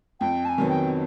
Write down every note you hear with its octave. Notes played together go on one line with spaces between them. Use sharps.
F2 G5
A5
G#5
C3 D#3 F#3 B3
G5